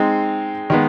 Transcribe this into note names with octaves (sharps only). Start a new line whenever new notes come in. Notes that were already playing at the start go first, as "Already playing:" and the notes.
Already playing: G#3 C4 D#4
D#3 G#3 B3